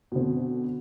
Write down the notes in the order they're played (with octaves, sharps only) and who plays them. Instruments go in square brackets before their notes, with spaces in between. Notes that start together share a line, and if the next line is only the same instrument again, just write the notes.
[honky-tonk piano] B2 D3 C4